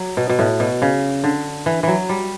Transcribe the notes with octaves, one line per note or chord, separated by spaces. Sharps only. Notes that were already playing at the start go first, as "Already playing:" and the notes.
Already playing: F#3
B2
B2
A2
B2
C#3
D3
E3
E3 F#3
G3